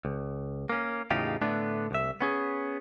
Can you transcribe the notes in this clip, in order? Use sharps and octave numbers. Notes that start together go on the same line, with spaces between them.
C#2
A#3 C#4
E2 A2 C#3 D#4 F4 G4
A2 D3 A3 B3 D4
C2 E5
B3 C#4 G#4